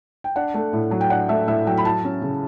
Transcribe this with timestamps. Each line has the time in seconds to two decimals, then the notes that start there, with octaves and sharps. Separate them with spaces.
0.24 G5
0.36 D4 F#5
0.54 A3
0.73 A2
0.91 F#3
1.01 G5
1.10 D4 F#5
1.29 A3 E5
1.47 A2 E5
1.67 F#3 G5
1.77 B5
1.84 E4 A5
2.04 C#4
2.22 C#3